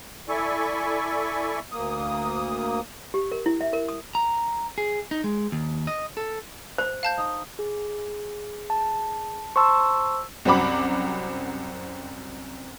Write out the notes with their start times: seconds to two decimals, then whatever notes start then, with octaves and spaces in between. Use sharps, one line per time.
0.29 E4 A4 D5 E5 G#5 C#6
1.72 D2 A#3 D#6
3.14 G4
3.32 A#4
3.46 E4
3.61 E5
3.73 A#4
3.89 D#6
4.15 A#5
4.78 G#4
5.11 D#4
5.24 G#3
5.52 D#2
5.87 D#5
6.17 A4
6.78 C5
7.03 F5 A5 G6
7.18 D#4
7.59 G#4
8.70 A5
9.56 C5 A5 C6 C#6 E6
10.45 C2 F#2 C4 F#4 B5 D6